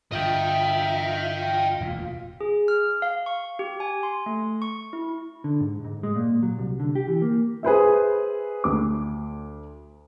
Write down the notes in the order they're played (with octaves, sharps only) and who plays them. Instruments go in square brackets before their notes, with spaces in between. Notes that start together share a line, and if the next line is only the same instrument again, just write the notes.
[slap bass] G2 D3 [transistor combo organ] F4 [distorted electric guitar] D#5 G5 [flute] E5
[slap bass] E1 D2 A#2
[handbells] G#4
F6
F5
C#6
G4
G#5
C6
A3
C#6
E4
[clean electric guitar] D3
G#2
G#2
G#3
A#2
F#3
C2
D3
G4
E3
A#3
[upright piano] G#4 B4 C5 E5
D2 D6